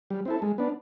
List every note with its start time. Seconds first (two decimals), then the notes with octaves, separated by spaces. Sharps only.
0.10 G3
0.25 C4 E4 A4
0.42 G#3
0.58 B3 D4